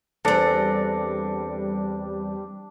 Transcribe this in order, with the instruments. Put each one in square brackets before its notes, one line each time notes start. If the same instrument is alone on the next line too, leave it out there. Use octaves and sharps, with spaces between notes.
[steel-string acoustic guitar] E2 C4 [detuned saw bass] G3 [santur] D4 [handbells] A4 A#6 C#7